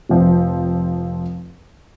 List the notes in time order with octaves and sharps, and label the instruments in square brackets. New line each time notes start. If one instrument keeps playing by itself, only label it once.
[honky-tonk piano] F1 F3 C4